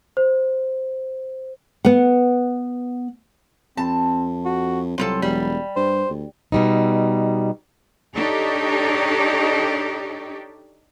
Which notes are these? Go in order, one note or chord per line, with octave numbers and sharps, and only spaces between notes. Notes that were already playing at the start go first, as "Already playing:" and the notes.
C5
B3 F#5
F2 C4 A5
F#4
C2 F#3 C4 F4 A4
E1 G3
G2 C5
D2
B2 G3 D#4
D4 D#4 G4 A4 C#5